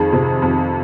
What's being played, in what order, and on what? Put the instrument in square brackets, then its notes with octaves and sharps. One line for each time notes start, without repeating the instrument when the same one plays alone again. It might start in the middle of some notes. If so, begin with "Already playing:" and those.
Already playing: [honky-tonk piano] F2 D#3 [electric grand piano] G#4
[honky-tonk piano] C3
F2